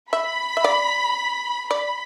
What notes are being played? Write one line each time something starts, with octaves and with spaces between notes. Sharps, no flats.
E5 B5
E5
D5
D5 B5